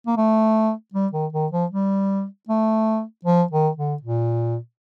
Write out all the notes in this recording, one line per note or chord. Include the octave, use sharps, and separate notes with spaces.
A#3
A3
G3
D#3
D#3
F3
G3
A3
F3
D#3
D3
A#2